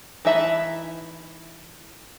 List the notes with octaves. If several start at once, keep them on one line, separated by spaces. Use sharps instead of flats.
E3 D#4 E5 A5 B5